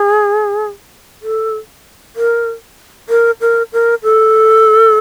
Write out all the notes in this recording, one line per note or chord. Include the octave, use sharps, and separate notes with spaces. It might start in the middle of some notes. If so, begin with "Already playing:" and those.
Already playing: G#4
A4
A#4
A#4
A#4
A#4
A4